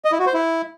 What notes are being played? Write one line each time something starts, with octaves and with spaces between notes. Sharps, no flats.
D#5
E4
F#4
C5
E4